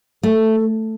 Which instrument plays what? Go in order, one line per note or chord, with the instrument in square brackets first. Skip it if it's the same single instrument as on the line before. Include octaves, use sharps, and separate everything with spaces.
[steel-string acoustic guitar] A3 [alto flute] A4